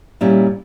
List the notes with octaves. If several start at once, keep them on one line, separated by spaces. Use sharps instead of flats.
A#2 G3 C#4 E4